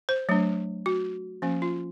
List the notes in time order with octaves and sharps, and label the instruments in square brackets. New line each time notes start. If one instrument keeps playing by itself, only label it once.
[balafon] C5
F#3 A3 D4
F#4
F3 A#3 C#4
F4